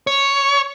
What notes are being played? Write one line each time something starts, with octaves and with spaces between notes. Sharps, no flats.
C#5